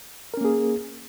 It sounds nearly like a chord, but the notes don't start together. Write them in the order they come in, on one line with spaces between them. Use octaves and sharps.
A#4 C#4 A#3 G#4